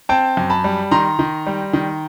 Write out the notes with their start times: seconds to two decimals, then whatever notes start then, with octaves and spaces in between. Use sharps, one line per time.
0.09 C4 G5 A5
0.37 F#2
0.50 A5 B5
0.64 G3
0.91 D#3 A#5 C6
1.19 D#3
1.46 G3
1.73 D#3